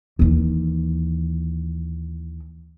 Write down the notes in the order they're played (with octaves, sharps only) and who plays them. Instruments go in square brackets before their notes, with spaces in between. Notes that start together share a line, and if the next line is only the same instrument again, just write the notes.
[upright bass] D#2 E3